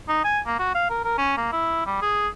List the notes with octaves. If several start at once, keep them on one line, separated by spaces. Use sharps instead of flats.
D#4
G#5
A#3
F#4
F5
A#4
A#4
C#4
A#3
E4
G3
G#4